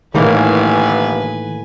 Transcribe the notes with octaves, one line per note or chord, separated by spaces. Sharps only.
G1 A2 D#3 E3 A#3 B4 G#5